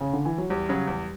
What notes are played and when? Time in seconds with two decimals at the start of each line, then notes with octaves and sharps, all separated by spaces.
0.01 C#3
0.13 D3
0.25 E3
0.38 F#3
0.49 E2 G3
0.69 C#3 F#3
0.87 E2